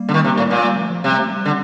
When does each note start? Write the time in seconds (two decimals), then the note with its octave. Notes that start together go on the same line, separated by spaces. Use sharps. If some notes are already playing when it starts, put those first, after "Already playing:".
Already playing: G3 A#3
0.09 D3
0.14 D#3
0.24 C3
0.37 A2
0.51 A#2
0.64 G3 A#3
0.77 F3 A3
0.91 F3
1.04 C3 G3
1.18 A3
1.31 G3
1.45 D3